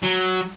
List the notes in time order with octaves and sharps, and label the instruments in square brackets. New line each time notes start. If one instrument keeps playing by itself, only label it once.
[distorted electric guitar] F#3